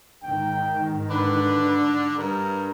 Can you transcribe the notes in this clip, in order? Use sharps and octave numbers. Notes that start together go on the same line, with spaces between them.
G#2 D#3 G5
D3 D4 B4
G2 A#4